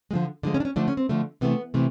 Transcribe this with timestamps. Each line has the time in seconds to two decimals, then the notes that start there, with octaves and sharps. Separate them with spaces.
0.11 G#3
0.13 D3 F3
0.43 D3 F3 G#3 D4
0.54 C#4
0.60 D4
0.65 C#4
0.76 D3 F3 A3 D4
0.88 C#4
0.97 C4
1.09 D3 F3 A3
1.41 C3 E3 A3 B3
1.74 C3 E3 A3